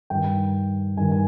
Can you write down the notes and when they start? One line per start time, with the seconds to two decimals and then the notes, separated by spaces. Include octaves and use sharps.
0.10 G2 D#3 G5
0.97 G2 D#3 G#5
1.11 G#5